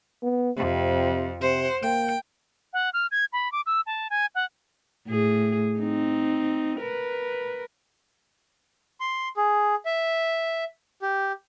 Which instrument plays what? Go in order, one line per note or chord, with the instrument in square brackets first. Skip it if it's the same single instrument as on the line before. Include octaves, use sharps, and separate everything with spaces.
[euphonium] B3
[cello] F2 [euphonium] C3
[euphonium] C3 [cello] C5 F#5
[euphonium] A#3 [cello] G5
[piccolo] F#5
F6
G#6
B5
D6
E6
A5
G#5
F#5
[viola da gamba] A2 G#4
C4 D#4
A#4 B4
[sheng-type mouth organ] C6
G#4
E5
G4